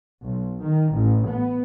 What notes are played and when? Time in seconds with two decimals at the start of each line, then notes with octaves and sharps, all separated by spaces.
0.22 B1
0.63 D#3
0.92 A1
1.27 B3